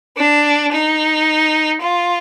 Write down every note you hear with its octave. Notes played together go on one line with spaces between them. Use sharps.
D4
D#4
F4